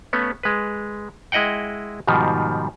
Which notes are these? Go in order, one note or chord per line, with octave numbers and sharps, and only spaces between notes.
A3 B3 C#4
G#3 B4
G#3 E4 D#5 F#5 G5
G#2 B2 D#3 F3 G3